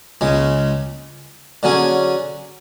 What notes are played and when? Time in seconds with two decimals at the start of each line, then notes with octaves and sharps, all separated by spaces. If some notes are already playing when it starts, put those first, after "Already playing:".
0.21 C#2 C#3 G#3
1.63 D3 F#3 C#4 G#4